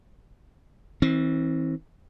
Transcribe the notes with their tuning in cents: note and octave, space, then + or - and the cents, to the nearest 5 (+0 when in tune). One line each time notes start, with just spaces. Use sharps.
E3 -40 C4 +20